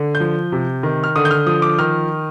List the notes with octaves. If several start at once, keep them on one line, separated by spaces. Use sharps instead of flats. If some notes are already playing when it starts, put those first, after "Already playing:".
Already playing: D3
G6
F3
C3
D#3
F6
D3 D#6
G6
F6
F3 D#6
D6
D#3 F6